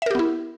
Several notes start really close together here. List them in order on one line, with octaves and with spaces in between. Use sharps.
E5 A#4 G4 B3 E4